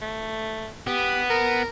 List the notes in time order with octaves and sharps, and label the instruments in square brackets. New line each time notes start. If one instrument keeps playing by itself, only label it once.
[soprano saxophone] A3
[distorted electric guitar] B3 [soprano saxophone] G4
[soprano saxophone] A#4